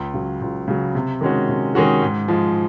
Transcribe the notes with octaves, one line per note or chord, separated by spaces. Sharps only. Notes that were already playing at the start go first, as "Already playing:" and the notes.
Already playing: C#2
C#3 F#3
C#2
C#3 F#3
C3
D#3 G#3 C#4 F#4
C3
D#3 G#3 C#4 F#4
G#2
F3 G#3